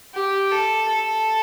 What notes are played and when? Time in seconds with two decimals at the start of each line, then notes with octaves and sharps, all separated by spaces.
0.14 G4
0.52 A4
0.88 A4